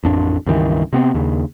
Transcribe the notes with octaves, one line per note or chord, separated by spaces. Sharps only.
A1 F2 D4
C#2 G2 D#3 E3
C3 B3 C4
D#2 C#3